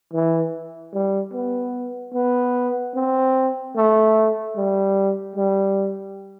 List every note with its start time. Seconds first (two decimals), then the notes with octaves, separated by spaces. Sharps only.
0.13 E3
0.93 G3
1.33 B3
2.14 B3
2.95 C4
3.76 A3
4.56 G3
5.36 G3